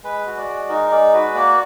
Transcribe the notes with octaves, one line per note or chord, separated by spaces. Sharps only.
G#3 B4
F#4
D5
G#3
D#4 A#4
G#3 D5
F#4 B4
A#3 D5